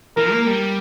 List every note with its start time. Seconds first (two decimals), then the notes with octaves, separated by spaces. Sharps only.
0.17 E3 A#4
0.32 A#3
0.47 G3